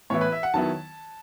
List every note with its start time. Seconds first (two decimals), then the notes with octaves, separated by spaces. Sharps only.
0.10 A2 E3 B3 E4 C#5
0.21 B4
0.32 E5
0.43 F#5
0.54 D#3 F#3 B3 E4 A5